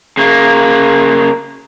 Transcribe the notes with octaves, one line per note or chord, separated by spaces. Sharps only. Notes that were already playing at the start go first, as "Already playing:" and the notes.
C#3 A#3